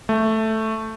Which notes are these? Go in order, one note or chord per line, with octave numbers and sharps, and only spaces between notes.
A3